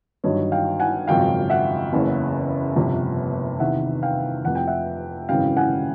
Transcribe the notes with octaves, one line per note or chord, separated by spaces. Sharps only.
G1 G2 D#3 F#3 C#5 D#5
F5 G5
F#5 G#5
G#1 F#2 C#3 F3 F5 G5
E5 F#5
F#1 E2 C#3
G1 F2 C3
E2 C3 D#3 E5 F#5
F5 G5
F1 F2 C3 F3 F#5
G5
E5 F#5
G#1 F#2 C#3 E3 F5 G5
F#5 G#5